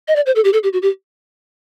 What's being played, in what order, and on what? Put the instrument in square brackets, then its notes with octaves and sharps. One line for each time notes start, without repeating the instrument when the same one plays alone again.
[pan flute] D#5
D5
C5
A4
G4
A4
G4
F#4
G4